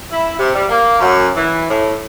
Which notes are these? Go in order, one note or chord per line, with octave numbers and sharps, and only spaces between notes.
E4
C3
G3
A#3
F#2
E3
A2